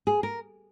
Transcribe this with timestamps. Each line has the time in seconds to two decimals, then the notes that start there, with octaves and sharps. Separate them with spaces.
0.07 G#4
0.23 A#4